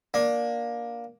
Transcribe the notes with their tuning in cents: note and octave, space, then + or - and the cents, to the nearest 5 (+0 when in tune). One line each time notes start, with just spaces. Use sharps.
A#3 +15 D4 +0